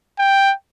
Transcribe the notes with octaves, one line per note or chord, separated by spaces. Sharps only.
G5